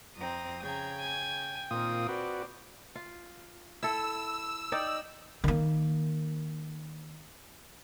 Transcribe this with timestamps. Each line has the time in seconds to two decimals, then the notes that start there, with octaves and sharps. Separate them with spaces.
0.17 F2 C4 A#5 D#6
0.62 C#3 G#4 G5 A#5 G#6
0.98 G#5
1.71 A#2 D#3 C4 F4 D#6
2.09 F#4 B4 D5
2.95 F4
3.83 E4 A4 E6
4.72 D#4 D5 G5
5.44 D#3 A#3